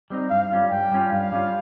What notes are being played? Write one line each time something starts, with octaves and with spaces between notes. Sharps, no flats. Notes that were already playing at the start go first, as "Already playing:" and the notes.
G3 C4 D#4
G2 F5
G3 C#4 F4
G2 G5
G3 C#4 F4
G2 F5
G3 C#4 F4